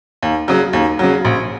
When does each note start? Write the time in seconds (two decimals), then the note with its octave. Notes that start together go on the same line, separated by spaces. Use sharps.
0.23 D#2
0.48 C#3 F#3
0.73 D#2
0.99 C#3 F#3
1.25 A#1